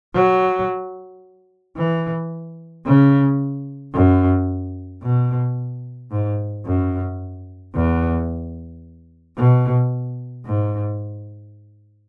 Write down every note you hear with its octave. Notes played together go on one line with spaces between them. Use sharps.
F#3
E3
C#3
F#2
B2
G#2
F#2
E2
B2
G#2